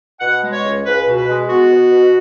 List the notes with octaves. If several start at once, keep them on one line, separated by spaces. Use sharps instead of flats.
B2 F#5
G#3
C#5
C#2
C#2 B4
B2
B4
G#3
B3 F#4
B2
B2